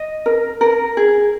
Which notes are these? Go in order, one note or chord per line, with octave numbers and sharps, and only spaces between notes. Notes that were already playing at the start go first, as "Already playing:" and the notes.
Already playing: D#5
A#4
A#4
G#4